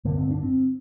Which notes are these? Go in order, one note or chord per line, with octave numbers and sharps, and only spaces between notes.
G2 D3 A#3
C4
D4
C4